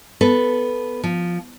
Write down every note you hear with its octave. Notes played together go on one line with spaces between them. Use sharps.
B3 A4 B4
F3